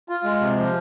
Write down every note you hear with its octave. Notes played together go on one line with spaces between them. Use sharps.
F4
G#3
C3
F3